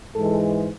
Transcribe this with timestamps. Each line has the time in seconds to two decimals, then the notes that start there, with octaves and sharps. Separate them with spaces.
0.15 G#2 E3 G#3 A4